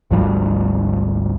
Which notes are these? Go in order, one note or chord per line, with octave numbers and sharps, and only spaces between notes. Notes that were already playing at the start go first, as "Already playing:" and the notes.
G#1 D2 F3 G3